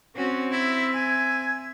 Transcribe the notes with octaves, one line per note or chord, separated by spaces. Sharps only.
C4 C#4 F#4
E4 E5
G#5